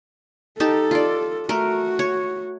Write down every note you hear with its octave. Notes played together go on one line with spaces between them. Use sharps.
D#4 G4 A4 A5
F4 D5
A3 F#4 A#4
C#5